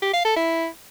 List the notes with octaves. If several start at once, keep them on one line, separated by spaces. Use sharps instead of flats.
G4
F5
A4
E4